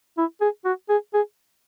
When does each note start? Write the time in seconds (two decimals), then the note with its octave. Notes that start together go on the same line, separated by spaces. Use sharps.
0.18 E4
0.41 G#4
0.65 F#4
0.89 G#4
1.14 G#4